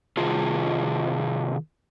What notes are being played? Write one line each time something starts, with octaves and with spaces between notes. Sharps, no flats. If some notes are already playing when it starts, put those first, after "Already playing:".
C3 D#3 F4 G#4